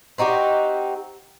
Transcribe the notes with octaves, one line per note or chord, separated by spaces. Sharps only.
C4 D#4 F#4 G4